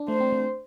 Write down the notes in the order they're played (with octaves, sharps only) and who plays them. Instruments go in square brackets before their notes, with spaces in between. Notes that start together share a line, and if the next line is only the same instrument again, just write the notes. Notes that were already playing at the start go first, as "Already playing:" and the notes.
Already playing: [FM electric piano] D4
[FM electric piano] A3 [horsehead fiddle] C5
[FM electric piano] C4
A3